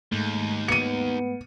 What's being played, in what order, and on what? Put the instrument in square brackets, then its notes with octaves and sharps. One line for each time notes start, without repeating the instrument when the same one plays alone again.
[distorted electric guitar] D#2 [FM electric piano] G#2 G#3 A3
[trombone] B3 [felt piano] C#7 D#7